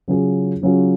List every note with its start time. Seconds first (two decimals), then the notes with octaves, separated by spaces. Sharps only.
0.08 C#3 F#3 C#4 F4 G#4
0.62 C#3 F#3 C#4 F4 G#4